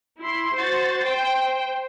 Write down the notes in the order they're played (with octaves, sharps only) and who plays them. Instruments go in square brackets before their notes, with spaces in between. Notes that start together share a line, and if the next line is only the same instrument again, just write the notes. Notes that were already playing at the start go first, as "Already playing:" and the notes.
[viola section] E4 C6
[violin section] F#4 A6 [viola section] C5
[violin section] G5